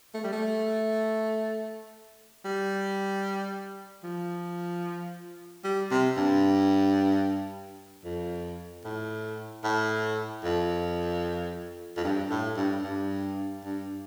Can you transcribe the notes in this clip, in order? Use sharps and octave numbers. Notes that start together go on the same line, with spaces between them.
A3
G3
A3
G3
F3
G3
C3
G2
F2
A2
A2
F2
F2
G2
A2
G2
G2
G2